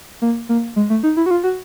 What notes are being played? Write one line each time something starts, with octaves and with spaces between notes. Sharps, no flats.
A#3
A#3
G#3
A3
D#4
E4
F#4
F4
F#4